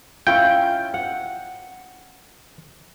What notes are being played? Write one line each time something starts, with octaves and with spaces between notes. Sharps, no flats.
C#4 E4 F4 G5
F#5